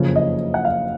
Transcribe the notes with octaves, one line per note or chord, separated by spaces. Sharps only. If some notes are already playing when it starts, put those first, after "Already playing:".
Already playing: F#1 F2 C#3 F3
D#5
F#5
F5